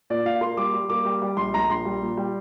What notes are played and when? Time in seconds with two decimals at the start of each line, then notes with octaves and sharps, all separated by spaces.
0.10 A#2 D5
0.25 A#2 F5
0.41 A#3 C6
0.57 G3 D6
0.74 G3
0.90 A#3 D6
1.05 G3
1.22 G3
1.37 A#1 C6
1.54 A#1 A#5
1.69 A#1 C6
1.85 G3
2.02 A#2
2.17 G3